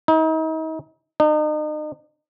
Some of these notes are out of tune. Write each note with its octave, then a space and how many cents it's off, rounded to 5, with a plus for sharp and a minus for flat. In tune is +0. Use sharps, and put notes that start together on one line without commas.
D#4 +40
D#4 -35